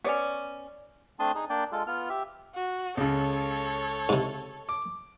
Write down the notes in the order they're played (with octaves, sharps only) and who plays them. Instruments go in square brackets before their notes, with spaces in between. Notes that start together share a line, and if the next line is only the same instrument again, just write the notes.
[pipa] B3 C#4 [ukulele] C#5 D5
[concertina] A3 C4 D4 A5 C6 D#6
D#4 G#4
A#3 D4 D5 G5
G#3 F4 A4
B3 F4 F6
G4 E5
[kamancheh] F#4
[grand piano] C#2 C#3 [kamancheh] A4 C#5
[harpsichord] G#2 C3
[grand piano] D6